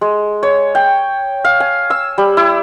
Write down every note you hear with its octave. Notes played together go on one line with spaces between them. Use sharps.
G#3
C#5
G5
F5
G#5
E6
G3
E4